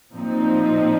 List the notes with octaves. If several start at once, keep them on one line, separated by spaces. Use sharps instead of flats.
A#2 F3 C4 D#4